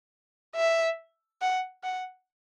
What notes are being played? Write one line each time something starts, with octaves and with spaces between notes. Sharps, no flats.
E5
F#5
F#5